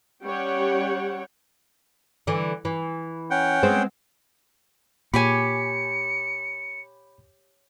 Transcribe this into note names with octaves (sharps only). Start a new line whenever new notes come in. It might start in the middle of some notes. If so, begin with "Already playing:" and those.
G3 C#4 C#5 F#5 G5
D3 E3
E3
C#4 F#5 G5
G#3 B3 C4
A#2 G4 C#5 G#5 B5 B6 C#7